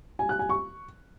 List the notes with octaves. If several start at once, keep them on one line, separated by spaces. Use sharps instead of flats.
G#5
F#6
G#5
C#6